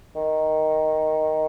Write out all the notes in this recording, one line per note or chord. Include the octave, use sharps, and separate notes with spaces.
D#3